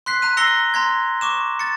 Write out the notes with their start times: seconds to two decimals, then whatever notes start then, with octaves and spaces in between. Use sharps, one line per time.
0.06 C6 F#6 B6 C7
0.22 A#5 F#6 D#7
0.37 A#5 E6 A#6 C7 C#7 G7
0.74 A#5 C6 G#6
1.21 C#6 D6 E7
1.59 A6 C#7